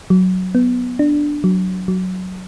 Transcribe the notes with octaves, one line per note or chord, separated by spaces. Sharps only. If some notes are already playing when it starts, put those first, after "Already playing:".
F#3
B3
D4
F#3
F#3